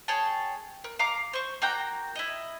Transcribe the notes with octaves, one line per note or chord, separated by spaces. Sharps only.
G#4 C#5 G5 A5
A#4
F5 A#5 D6
C5 C#6
A#3 F#4 G5 A#5
E4 D#5